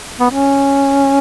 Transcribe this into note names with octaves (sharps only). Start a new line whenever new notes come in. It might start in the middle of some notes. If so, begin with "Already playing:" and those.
B3
C#4